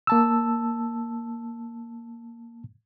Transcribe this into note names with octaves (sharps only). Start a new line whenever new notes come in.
A#3 A5 E6